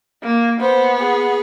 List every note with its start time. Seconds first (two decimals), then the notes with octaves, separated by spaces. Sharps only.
0.23 A#3
0.60 B3 C5
0.97 G#4